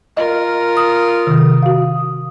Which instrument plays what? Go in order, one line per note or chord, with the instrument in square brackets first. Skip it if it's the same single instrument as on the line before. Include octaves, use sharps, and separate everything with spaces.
[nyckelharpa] F4 A#4 [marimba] D#5
[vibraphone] D#6
[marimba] C3 D#3
F#4 F5